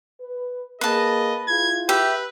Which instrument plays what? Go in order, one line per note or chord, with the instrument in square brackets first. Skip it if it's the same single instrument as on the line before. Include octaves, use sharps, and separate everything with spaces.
[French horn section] B4
[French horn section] A#3 G#4 [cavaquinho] B4 A5 [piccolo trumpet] D#5
[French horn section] E4 F4 G#4 [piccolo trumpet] G#6
[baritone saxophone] G4 [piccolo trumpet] B4 [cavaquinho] E5